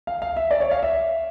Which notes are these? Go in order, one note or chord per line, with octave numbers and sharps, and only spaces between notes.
F5
F5
E5
D5
C#5
F5
E5